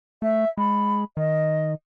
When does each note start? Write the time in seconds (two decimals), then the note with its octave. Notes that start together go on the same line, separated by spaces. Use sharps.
0.22 A3 E5
0.57 G#3 B5
1.17 D#3 D#5